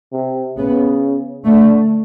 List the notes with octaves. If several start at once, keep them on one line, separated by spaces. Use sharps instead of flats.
C3
C#3 B3
D3 A3